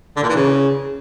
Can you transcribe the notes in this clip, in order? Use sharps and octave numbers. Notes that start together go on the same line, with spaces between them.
D3
A#2
E3
C#3